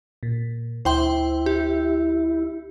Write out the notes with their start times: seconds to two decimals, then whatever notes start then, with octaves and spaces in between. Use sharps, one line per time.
0.23 A#2
0.85 D2 E4 C5 G5 C6
1.46 G4